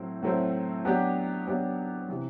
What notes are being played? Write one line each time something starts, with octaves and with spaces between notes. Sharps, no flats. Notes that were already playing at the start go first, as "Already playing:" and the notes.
Already playing: A2 F#3 A3 C4 E4
A2 F#3 A3 C4 E4
F#3 B3 D4 G4
F#3 B3 D4 G4
C3 E3